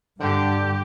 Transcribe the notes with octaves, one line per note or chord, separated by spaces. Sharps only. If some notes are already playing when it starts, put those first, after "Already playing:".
G2 D3 G4